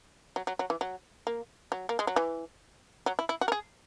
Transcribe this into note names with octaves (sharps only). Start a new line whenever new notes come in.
F#3
F#3
F#3
E3
F#3
A#3
F#3
A#3
G#3
F#3
E3
F#3
E4
E4
F#4
A#4
G#4